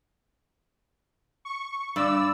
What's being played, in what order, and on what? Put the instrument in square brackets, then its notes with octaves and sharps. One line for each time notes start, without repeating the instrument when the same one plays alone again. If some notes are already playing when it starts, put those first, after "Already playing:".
[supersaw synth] C#6
[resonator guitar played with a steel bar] G2 [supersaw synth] D5 E6